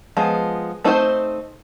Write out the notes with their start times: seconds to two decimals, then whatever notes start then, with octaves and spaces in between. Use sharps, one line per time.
0.17 F3 G#3 B3
0.84 A3 C4 D#4 G#4 C5